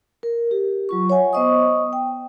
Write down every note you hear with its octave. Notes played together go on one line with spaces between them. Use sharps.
A#4
G4
F#3 F4 C#6
C#5 E5 F#5 G#5
B3 C5 D#5 C#6 D#6
G5